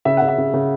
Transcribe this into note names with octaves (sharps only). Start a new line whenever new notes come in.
C#3 E5
C#3 F#5
E5
C#3
C#3